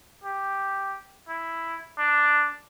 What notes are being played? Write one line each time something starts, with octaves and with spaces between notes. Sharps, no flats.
G4
E4
D4